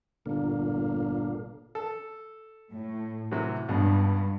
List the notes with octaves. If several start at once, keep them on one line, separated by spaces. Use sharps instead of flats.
G1 A#2 D3 A#3
A4
A2
C3 E3 F#3
C#2 G2 B2